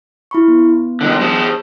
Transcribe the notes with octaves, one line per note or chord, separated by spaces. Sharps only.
E4 B5 C#6
B3
D3 D#3 G#3
G#4 C5 A5